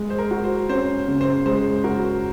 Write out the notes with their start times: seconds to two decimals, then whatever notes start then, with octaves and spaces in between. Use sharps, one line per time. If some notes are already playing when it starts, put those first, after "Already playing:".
Already playing: G#3
0.10 C5
0.19 A#4
0.31 F#4
0.44 C5
0.69 C#4 C5
1.08 C#3
1.21 C5
1.46 G#3 C5
1.84 F#4 A#4